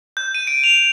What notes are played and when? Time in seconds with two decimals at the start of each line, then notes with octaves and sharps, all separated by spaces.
0.17 G6
0.35 D#7
0.47 D7
0.64 F7